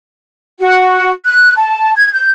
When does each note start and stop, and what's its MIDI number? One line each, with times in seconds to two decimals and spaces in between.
0.60 1.10 66
1.26 1.55 90
1.56 1.93 81
1.95 2.11 92
2.13 2.32 91